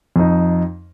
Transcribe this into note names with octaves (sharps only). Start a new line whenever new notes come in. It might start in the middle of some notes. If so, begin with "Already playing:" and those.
F2 D#4